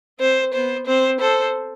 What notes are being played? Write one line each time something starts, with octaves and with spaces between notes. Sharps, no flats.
C4 C5
B3 C5
C4 C5
A4 C5